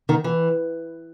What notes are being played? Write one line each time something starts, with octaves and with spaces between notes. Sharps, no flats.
D#3
E3